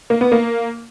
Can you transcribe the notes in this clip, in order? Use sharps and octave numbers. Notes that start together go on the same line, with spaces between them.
A#3
B3
A#3